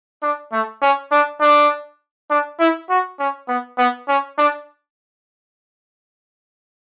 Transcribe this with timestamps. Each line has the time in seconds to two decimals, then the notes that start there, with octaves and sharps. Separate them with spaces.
0.22 D4
0.52 A3
0.82 C#4
1.11 D4
1.41 D4
2.30 D4
2.60 E4
2.90 F#4
3.19 C#4
3.48 B3
3.78 B3
4.08 C#4
4.38 D4